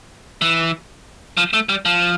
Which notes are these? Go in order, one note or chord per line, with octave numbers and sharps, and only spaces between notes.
E3
F3
A3
G3
F3